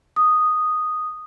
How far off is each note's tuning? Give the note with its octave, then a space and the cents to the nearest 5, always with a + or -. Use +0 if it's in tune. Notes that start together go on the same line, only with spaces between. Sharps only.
D#6 -5